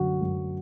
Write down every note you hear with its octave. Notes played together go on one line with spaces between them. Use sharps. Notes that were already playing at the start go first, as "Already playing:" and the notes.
Already playing: F#2 D3 F#3 F#4
F#2